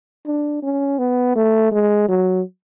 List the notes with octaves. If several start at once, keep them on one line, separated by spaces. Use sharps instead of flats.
D4
C#4
B3
A3
G#3
F#3